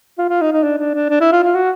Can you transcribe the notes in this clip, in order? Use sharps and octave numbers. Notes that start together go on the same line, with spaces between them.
F4
F4
D#4
D#4
D4
D4
D4
D4
E4
F4
F4
F#4